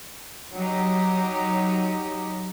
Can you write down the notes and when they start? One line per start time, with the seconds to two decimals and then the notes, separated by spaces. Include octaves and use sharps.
0.54 F#3 D#4 G4